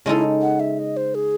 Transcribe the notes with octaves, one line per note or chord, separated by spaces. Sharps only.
C#3 G#3 D#4 E4 A4
F#5
E5
D#5
C5
G#4